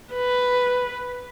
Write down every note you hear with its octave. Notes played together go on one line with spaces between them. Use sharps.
B4